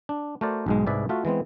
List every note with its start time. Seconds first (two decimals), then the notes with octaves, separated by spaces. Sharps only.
0.09 D4
0.41 A3 F#4 A#4 C5 D5
0.66 B1 G#2 G#3
0.86 C2 G#2 G#4 B4 D5 E5
1.09 A3 F4 F#4 E5
1.25 E3 G#3 B3 C4